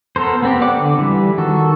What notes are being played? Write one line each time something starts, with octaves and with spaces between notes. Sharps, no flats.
B3 A4 A#4 C5
B3 C4 G4
D5 F#5 D6
D3
E3 G3
D#3 F#4 A4